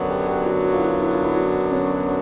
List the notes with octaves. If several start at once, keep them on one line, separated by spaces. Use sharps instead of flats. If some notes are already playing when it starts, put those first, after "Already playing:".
Already playing: F#2 D3 F#3 B3 D4
G4
G4
F#4
F#4
F4
E4
F4
E4
F4
E4
F#4
C#4